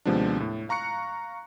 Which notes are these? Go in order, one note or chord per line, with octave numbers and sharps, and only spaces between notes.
D#2 C3 F3 G#3 B3 D4
A2
F5 A#5 C#6 F#6 C#7